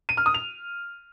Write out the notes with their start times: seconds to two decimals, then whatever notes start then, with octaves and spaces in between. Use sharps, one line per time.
0.09 D#7
0.17 F6
0.26 D#6
0.34 F7